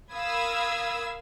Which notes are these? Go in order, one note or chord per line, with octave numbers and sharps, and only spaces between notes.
A#4 F5 B5 D#6 E6 G#6